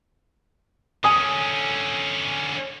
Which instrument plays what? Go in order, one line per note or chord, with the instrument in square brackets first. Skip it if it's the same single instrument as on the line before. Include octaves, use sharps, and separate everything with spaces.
[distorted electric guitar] D3 C#4 [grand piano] G#5 D#6